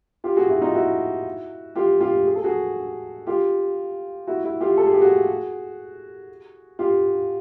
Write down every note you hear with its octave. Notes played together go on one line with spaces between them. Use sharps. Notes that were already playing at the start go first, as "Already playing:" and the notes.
F4 G4
F#4 G#4
E4 F#4
D#4 F4
E4 F#4
F4 G4
F4 G4
G#4
A4
F#4 G#4
F4 G4
E4 F#4
E4 F#4
F4 G4
A4
G#4
G4
F#4 G#4
F4 G4